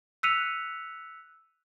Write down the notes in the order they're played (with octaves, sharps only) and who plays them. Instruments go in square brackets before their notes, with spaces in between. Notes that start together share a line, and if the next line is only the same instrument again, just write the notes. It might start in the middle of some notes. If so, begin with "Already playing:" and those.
[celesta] E6 F#6 B6 C#7 D#7 F7